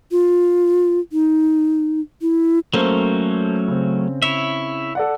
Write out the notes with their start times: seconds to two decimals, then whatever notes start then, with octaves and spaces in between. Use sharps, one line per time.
0.11 F4
1.12 D#4
2.22 E4
2.74 F#3 A3 A#3 C#4 A4 C5
3.68 C#3 C4
4.22 E4 C#5 E5
4.95 A4 D5 F#5